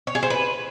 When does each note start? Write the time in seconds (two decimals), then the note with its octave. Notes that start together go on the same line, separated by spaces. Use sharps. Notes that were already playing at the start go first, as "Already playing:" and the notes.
0.07 C#5
0.15 G#4
0.23 C5
0.30 B4